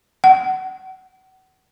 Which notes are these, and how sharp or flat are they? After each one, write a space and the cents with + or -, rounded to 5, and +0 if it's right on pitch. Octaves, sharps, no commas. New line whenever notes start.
F#5 +35